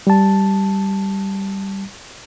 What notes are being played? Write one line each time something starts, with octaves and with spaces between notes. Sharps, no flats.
G3 A5